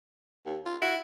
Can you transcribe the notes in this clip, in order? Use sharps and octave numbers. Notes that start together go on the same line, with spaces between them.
D#2
F4
E4 F#4